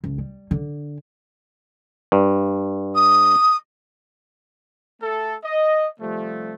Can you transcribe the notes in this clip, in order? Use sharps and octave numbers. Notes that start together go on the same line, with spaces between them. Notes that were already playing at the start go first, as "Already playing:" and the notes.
C#2
G3
D3
G2
D#6
A3 A4
D#5
C3 F3 G3 A3